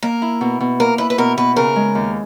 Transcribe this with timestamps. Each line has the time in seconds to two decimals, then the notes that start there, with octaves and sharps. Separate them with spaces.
0.03 A#3 A#4
0.22 E4
0.41 B2
0.60 B2
0.80 A#3 A#4
0.98 E4 B4
1.10 B4
1.18 B2 A#4
1.37 B2 B4
1.56 C#3 A#4
1.76 G#3
1.95 D#2